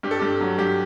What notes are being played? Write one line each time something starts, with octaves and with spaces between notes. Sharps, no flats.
G2 G4
A4
G2 G4
F#3
G2 G4